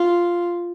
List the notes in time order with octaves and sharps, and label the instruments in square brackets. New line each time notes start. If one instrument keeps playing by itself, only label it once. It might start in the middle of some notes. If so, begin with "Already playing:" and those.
Already playing: [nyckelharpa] F4